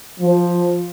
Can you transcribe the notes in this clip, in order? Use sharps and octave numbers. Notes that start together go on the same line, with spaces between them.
F3